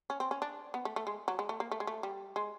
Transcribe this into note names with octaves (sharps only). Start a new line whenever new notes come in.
C#4
C4
C#4
D4
B3
A3
A3
G#3
F#3
G#3
A3
A#3
A3
G#3
A3
G3
G#3